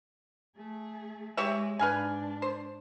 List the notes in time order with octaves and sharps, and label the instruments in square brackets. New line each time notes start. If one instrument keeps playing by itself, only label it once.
[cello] A3 G#4
[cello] G#3 [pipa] G4 C#5 E5
[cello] G#2 D4 [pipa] B4 F5 G#5
[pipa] C5